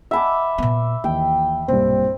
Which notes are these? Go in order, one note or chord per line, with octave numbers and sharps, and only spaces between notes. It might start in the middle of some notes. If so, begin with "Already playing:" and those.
E5 F#5 G#5 A5 B5 D6
A#2 B3
D#2 E3 E4 G5
B1 G2 A#2 C4